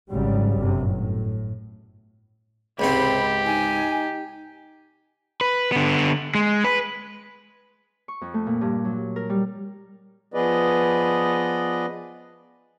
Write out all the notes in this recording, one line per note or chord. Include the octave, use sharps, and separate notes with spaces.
G#1 G#2 C#3 F#3 G3
G1 F#2 C3
A2
C#2 G#2 C3 C4 G4 B5
D#4 G#5
B4
D3 B3
G#3
B4
C#6
F2
A3
A#2
G2
F#3
A#4
G3
F3 B3 G#4 B4 D5 D#5